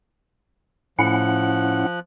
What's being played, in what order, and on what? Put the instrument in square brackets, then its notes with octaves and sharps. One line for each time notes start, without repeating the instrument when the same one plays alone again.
[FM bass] A2 [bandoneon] F3 F#6 [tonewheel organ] C#4 E4 F#5